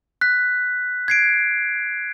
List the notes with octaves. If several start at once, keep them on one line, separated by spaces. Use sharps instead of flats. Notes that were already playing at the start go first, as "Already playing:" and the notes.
F#6 B6
G#6 C7 D7